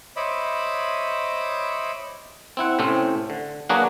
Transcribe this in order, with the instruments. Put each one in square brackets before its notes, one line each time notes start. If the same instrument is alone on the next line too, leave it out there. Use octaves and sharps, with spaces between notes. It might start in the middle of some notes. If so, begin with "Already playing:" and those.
[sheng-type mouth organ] C5 C#5 D#5 E5 B5 D6
[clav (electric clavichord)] C4 E4 F#5
A2 C3 A3 C4 C#4
D3
F#3 A#3 D4 F#4 G#4 B4